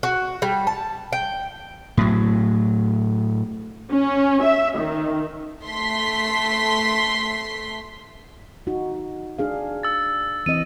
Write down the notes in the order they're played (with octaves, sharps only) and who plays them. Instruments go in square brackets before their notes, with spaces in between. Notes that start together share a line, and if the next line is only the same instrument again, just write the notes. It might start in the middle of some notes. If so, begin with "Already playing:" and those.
[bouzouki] F#4
G3
A5
G5
[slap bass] A2 F#3
[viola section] C#4
E5
D#3
[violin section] A3 C6 B6
[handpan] D#4 F#4
D4 G#4 F5
[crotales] E6 A6
[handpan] E3 C4 D#5 [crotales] D#7